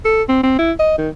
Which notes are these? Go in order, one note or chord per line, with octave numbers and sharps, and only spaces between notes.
A4
C4
C4
E4
D#5
D#3